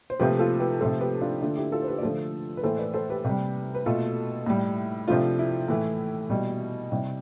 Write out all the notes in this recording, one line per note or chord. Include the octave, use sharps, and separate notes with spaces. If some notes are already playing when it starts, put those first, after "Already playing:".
C5
C3 F3 A3 G4 B4
F4 A4
G4 B4
C3 F3 A3 A4 C5
G4 B4
D4 F4
D3 A3 D4 F4
E4 G4
F4 A4
C5
G4 B4
D5
D3 F3 A3 A4 C5
B4
A2 E3 A3 A4 C5
B4 D5
A4 C5
G4 B4
C3 G3
B4
B2 A3 F4 A4
A2 G3
C3 F3 A3 D4 F4
E4
A2 E3 A3
B2 G3
C3 G3 E4